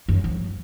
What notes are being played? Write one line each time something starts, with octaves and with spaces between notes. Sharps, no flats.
F#2
F2